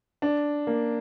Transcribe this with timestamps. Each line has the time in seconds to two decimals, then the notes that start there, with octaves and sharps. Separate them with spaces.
0.22 D4
0.67 A#3